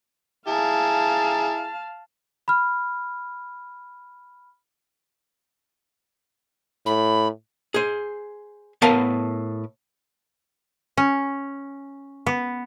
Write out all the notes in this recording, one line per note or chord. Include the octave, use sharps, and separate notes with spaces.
E4 G#4 F5 A5 A#5
B5 F6
A2 B5
G#4 C5
A2 B3 A#4 B4 F5 A5
C#4
B3